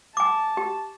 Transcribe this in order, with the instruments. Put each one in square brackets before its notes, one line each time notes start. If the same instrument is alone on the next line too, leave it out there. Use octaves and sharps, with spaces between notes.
[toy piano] G#5 D6 [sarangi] A5
[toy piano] G4